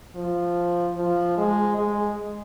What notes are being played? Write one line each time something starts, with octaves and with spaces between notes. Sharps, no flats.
F3
F3
G#3
G#3